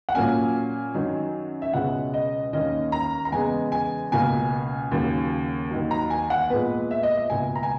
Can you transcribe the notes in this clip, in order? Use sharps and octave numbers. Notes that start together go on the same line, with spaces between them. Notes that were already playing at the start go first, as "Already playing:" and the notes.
F#5
A#2 F#3 A#3 C#4 G#5
F#2 D#3 F#3 C#4
E5
C#2 B2 G#3 C#4 F#5
D#5
D#2 D#3 A#3 C#4 D#5
A#5
A#5
E2 C#3 G#3 B3 G#5
G#5
C#2 B2 A#3 G#5
D#2 C#3 F#3
D#2 D#3 F#3
A#5
G#5
F#5
A#2 G#3 B3 B4
E5
D#5
E5
C#2 B2 A#3 G#5
A#5
G#5